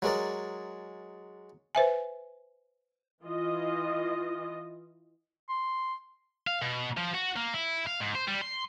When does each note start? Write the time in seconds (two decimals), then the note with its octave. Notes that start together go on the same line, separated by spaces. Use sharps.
0.02 F#3 G#3 A#4 D5
1.75 B4 C5 E5 G#5
3.24 E3 F4 D#5
5.49 C6
6.47 F5
6.62 B2
6.97 F3
7.14 F#4
7.36 A#3
7.54 E4
7.87 F5
8.00 G#2
8.15 C5
8.27 G3
8.41 C6